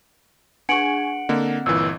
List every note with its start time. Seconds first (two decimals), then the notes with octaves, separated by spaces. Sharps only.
0.69 D4 G#4 F#5 G#5 C#6 C#7 D7 F#7
1.29 D3 A#3 C4 D#5
1.66 G1 A#2 E3 E6